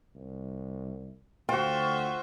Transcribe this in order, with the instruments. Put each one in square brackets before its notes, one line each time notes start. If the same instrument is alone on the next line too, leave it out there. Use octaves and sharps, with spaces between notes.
[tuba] C2
[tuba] D2 [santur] F4 F#4 [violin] C5 E5 [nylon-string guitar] G5